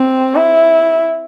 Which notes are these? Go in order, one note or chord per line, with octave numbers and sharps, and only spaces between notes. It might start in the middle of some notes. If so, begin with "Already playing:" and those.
Already playing: C4
E4